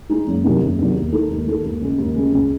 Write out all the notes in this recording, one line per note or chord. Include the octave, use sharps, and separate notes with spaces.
G#3 D#4 G#4
F#1
E2 C3 D#3 F#3
F#1
E2 C3 D#3 F#3
D#2
D#3 G#3 D#4 A4
D#2
D#3 G#3 D#4 A4
D#2
C#3 G#3
D#2
C#3 G#3
C#2